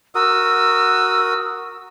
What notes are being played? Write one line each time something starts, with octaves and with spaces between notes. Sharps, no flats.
F#4 A#4 D#6 E6